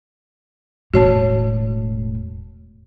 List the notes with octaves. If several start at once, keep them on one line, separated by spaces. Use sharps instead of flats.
E1 A2 F#4 C#5 A5